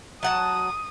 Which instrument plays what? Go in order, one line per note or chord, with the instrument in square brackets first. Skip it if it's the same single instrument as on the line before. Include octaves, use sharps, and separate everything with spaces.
[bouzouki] F#3 F#5 A5 [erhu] D#6